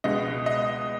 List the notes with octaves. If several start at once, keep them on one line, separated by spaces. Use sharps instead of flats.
C#2 B2 G#3 D#5
D#5